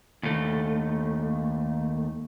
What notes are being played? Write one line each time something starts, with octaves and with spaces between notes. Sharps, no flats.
D#2 A3